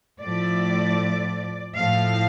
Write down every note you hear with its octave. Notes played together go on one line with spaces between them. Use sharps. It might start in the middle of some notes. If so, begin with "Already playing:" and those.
A2 F3 A3 D5
A2 F3 A3 F5